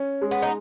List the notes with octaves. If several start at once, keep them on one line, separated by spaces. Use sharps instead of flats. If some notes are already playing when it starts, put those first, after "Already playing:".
Already playing: C#4
G#3
B3
D#4